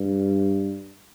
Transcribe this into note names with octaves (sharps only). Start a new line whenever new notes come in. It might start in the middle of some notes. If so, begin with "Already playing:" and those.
Already playing: G2